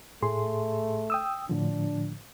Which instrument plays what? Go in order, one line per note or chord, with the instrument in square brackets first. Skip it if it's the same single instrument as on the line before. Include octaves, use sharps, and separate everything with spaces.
[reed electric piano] A2 G#4 C6 [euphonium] A3
[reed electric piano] G5 D#6 E6
[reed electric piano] A2 D3 F3 [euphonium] D4